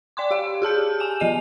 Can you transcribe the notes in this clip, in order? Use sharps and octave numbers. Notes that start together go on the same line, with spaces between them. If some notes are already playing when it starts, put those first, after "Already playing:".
D5 G5 C6 D6
G4 F5
G4 G#4 A5 G6
G#5 E7
F3 B3 D#5 D#7 F7